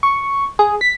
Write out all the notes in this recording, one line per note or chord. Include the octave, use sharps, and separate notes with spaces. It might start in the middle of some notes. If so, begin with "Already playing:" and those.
C#6
G#4
B6